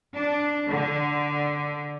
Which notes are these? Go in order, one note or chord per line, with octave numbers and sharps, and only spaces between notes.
D4
D3